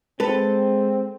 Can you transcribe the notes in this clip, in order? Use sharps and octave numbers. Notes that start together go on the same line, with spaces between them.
G#3 C4 A4 B4